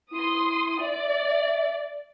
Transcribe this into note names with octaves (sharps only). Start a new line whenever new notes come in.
E4 C6 D#6
D5 E5